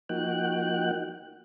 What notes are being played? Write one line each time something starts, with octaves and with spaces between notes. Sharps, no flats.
F3 A#3 D#4 F#4 G5 F#6